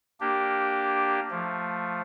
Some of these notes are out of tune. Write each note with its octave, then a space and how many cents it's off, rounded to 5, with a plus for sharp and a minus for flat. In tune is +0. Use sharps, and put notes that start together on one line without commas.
A#3 +0 D4 +0 G4 -5
F3 +10 A3 +15